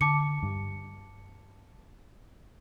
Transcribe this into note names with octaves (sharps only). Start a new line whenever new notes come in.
D3 A5 D6 C#7
G2